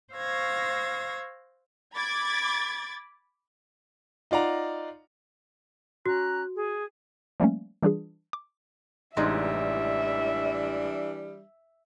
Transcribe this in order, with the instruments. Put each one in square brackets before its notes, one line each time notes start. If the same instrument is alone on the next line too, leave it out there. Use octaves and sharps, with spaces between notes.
[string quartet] C5 F5 C#6 E6 G#6 A#6
[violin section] B5 D6 G#6 A6
[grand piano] D#4 F4 D5 F#5 A#5
[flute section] C#4 A#5 F#6 [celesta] F#4
[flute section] G#4
[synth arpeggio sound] F3 G3 A3 A#3 C#4
E3 G3 D4 F4 G#4
D6
[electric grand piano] A1 [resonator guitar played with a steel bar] C3 G#3 D#4 [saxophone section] E3 G3 D4 [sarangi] E5